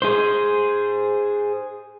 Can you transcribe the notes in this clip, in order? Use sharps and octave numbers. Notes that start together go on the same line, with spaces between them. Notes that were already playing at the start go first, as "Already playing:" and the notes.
G#4 C5